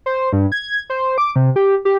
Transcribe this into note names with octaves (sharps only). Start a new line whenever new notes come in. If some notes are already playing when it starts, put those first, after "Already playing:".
C5
G2
G#6
C5
D6
C3
G4
G4